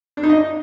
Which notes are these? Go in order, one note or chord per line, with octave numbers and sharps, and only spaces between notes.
D4
D#4
D#5